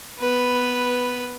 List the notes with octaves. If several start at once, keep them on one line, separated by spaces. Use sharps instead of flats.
B3 B4